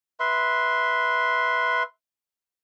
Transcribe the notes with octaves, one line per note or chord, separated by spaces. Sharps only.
B4 E5 C6